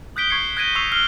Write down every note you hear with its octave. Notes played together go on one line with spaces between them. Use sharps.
D#6 F#6 G6 B6 D7 G7
C#6 G#6 C7 C#7
F#6 G#6 A#6 D7 D#7 G7
C#6 E6 C7 F7
F6 C7 G7